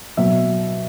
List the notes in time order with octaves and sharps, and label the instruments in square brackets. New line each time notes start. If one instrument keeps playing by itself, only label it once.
[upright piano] B2 F#3 E5